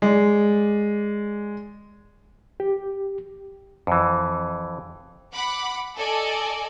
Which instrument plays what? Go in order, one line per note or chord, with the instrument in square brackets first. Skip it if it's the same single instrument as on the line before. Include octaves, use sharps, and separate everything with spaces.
[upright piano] G#3 D5
[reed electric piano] G4
[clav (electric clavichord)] F2 E3
[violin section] F#5 B5 D6
A4 D5 D#5 G#5